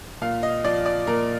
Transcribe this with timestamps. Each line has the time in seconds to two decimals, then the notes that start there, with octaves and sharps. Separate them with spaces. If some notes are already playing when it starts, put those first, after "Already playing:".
0.21 A#2 F5
0.43 D#5
0.64 F3 D5
0.86 D5
1.07 A#2 A#4